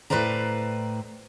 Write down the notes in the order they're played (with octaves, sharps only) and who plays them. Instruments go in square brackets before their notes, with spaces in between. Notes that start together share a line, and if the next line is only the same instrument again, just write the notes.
[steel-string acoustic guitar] A2 B4 C5 D5 A#5